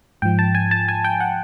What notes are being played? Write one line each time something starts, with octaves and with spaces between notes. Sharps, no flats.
G#2 F3 G5
A5
G#5
A5
G#5
G5
F#5